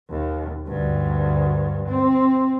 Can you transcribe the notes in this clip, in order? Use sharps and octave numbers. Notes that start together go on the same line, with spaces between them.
D#2
D2 G2
C4